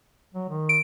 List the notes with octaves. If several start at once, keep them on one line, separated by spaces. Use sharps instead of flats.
F#3
D#3
D7